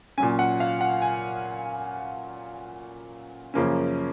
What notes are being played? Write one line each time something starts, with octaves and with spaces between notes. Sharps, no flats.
A#2 F#3 C#4 G#5
F#5
F5
F#5
G#5
F#2 C#3 F3 A#3 C#4